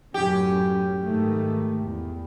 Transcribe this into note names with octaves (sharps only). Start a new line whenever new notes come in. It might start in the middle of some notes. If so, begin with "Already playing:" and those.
F#2 A2 C#4 G4
G#2 D#3 A3
E2